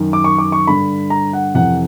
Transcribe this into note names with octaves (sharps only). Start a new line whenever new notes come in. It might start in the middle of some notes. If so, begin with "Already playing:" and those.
Already playing: F#2 D#3
D6
C#6
D6
C#6
G2 D3 B5
A#5
F#5
F2 C3 E3 F#5